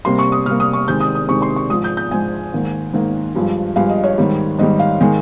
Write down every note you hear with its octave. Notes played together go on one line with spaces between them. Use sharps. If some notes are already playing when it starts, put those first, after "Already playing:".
C3 G3 A#3 C6
C#6
D#6
C3 G3 A#3 F6
D#6
C#6
C3 D#3 G#3 G6
D#6
D#6
C3 D#3 G#3 C#6
C6
C#6
G#2 F3 G#3 D#6
G6
G6
G#2 F3 G#3 G#5
G#2 D#3 A#3
G#2 D#3 A#3
G2 F3 G#3
G2 F3 G#3 F5
D#5
C#5
G#2 D#3 G3
G#2 D#3 G3 D#5
F5
D#3 G#3